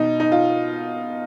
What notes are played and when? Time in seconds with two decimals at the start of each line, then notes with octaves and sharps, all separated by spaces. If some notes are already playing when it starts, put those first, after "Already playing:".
Already playing: B2 D#4
0.20 D#4
0.32 F4